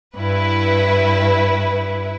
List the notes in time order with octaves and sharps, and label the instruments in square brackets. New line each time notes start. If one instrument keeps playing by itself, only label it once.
[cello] G2 [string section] E4 B4